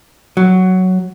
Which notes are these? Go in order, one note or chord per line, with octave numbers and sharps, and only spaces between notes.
F#3